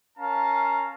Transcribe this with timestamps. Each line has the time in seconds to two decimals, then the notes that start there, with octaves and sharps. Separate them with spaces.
0.18 C#4 A#4 F5 A5 A#5